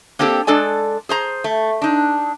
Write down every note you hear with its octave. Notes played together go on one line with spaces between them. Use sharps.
A#3 C4 D4 G4 A4
G#3 D4 A4 D5 G#5
G#4 C5 A#5
A3
D4 D#4